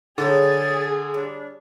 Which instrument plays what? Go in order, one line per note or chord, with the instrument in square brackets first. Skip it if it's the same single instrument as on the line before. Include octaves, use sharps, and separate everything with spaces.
[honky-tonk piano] D3 [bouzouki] F#3 G3 C#4 [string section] G#4 [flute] A6
[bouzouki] G3 C#5 [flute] D4